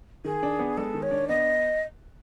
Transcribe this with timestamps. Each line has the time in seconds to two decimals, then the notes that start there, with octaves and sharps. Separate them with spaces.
0.25 D#3 G#4
0.43 D4
0.59 B3
0.77 G#3 A4
0.94 D#3
1.03 C#5
1.11 D4
1.28 B3 D#5